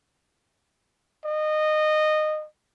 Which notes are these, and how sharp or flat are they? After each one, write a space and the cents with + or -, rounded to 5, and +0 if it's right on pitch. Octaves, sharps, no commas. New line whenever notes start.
D#5 -20